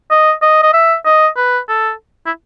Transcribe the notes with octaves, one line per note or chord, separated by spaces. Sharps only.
D#5
D#5
D#5
E5
D#5
B4
A4
E4